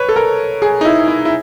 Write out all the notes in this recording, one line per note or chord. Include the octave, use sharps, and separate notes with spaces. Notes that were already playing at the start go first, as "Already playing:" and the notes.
Already playing: B4 C#5
A4
A#4
G#4
D#4
E4
E4
E4